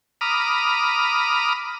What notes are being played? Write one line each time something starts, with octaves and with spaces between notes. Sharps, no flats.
A#5 B5 D6 D#6 F6